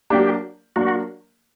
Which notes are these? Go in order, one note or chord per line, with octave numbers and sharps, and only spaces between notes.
F#3 A#3 D4 G4
F#3 A#3 D4 F#4